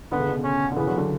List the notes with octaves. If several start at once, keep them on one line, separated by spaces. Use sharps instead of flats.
D3 B3
C#3
B2 D3
C#4
D3
C#3 E3 B3
D3 F#3
D3 F#3